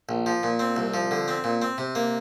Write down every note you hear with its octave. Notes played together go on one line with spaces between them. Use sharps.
A#1
F3
A#2
C4
C2
F3
D3
C4
A#2
C4
C3
A#3